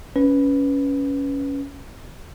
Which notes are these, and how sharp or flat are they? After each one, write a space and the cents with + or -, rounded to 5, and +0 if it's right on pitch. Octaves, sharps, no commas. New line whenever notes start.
C#4 +10 B4 +0